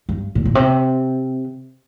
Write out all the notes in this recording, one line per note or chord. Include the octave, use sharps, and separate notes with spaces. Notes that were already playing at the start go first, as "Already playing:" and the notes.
G2
A#2
A#2
C3